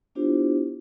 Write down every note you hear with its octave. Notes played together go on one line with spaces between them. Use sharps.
B3 D4 E4 F4 G4 C5